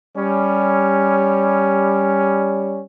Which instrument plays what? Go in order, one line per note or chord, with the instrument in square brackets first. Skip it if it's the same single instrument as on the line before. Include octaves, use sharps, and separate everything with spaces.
[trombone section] G3 C#4